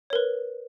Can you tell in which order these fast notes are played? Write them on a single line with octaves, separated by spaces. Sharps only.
C#5 A#4 B4